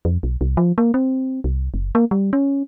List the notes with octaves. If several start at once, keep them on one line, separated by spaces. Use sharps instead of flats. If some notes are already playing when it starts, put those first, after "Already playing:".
F2
B1
C2
F3
A#3
C4
C2
F#1
A#3
G3
C#4